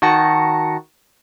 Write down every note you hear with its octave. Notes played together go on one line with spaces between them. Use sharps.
D#3 F#4 A5 A#6 C#7